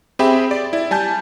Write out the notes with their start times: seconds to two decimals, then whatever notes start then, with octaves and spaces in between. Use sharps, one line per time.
0.19 C4 G4 G#4 E5 G5 B5
0.51 D5
0.73 E4
0.91 G3 G#5 A5 G6